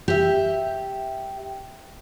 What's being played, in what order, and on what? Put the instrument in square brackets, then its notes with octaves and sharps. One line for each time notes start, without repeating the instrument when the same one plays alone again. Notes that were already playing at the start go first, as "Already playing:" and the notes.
[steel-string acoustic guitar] G4 E5